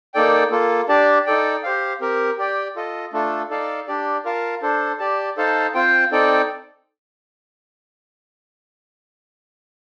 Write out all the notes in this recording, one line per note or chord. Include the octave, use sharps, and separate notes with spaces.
A#3 D#4 A4 D5 G5
A#3 F4 A4
D4 G4 D5 A5
D#4 A4 D5 G5
G4 C5 F5
C4 G4 A#4
G4 D5 G5
F4 A4 D#5
A3 D4 F4 A4
D#4 A4 D5 F5 A5
D4 G4 D5
F4 A#4 F5 A5
D4 A4 C5
G4 D5 A5
D#4 A4 C5 F5 A5
C4 F4 C5 G5
C4 D#4 A4 D5 G5